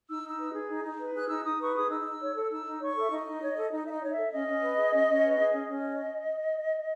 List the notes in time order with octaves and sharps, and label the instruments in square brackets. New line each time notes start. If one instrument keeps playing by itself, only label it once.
[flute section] D#4 E6
D#4
E6
B4
G#4
D#4
D#4
B4
G#4 F#6
D#4 E6
D#4 D#6
B4 C#6
G#4 D#6
D#4 E6
D#4
C#5
A4
D#4 E6
D#4
C#5 C#6
A4 E5
D#4 D#5
D#4
C#5
A4
D#4 D#5
D#4 E5
D#5
C#5
D#5
E5
A4
C#4 D#5
C#4
B4
G#4
C#4
C#4
B4
G#4
C#4 D#5
C#4